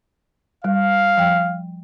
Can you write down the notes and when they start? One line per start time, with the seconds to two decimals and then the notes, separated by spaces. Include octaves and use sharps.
0.64 G3 F5
1.17 F3 G5